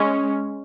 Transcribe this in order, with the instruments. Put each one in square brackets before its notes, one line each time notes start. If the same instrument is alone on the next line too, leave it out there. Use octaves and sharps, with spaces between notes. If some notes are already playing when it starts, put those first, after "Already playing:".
Already playing: [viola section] G#3 C#4